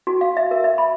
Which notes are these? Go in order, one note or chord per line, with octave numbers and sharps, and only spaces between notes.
F#4
F5
E5
A#4
E5
B5